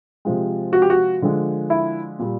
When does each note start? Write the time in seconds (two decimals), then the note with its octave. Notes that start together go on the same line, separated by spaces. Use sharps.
0.25 C3 F3 G#3
0.73 F#4
0.82 G4
0.90 F#4
1.22 D3 F3 G#3
1.70 E4
2.19 A#2 G3